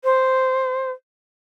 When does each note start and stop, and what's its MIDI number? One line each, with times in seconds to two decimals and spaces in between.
0.04 0.90 72